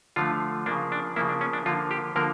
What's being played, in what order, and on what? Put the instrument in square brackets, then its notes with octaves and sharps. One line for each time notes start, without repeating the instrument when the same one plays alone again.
[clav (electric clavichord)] D3 F3 A3 F4
C#3 F3 A#3 D4
D4
C#3 F3 A#3 E4
D4
C#4
D4
D3 F3 A#3 F4
G4
D3 F3 A#3 A#4